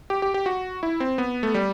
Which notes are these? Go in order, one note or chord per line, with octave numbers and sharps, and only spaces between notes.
G4
G4
G4
F#4
E4
C4
B3
A3
G3